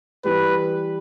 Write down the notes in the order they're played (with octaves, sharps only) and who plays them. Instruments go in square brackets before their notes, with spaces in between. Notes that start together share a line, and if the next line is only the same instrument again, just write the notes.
[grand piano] E3 G3 [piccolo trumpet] B4